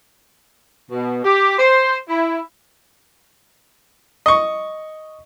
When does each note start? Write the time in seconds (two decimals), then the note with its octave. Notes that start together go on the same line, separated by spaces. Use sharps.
0.91 B2
1.24 G4
1.58 C5
2.09 E4
4.26 D#5 C#6